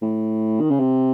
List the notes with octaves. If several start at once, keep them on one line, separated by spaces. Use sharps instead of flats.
A2
D#3
C#3
C3